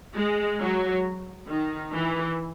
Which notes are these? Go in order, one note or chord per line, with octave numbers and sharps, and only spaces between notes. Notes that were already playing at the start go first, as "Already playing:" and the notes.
G#3
F#3
D#3
E3